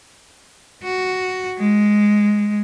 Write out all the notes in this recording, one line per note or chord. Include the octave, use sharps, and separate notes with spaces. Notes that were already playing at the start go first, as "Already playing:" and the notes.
F#4
G#3